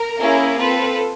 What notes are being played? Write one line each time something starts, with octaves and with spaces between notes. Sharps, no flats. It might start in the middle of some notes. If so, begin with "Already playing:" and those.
Already playing: A#4
A#3 C#4 E4 G#4
C4 F4 A4 B4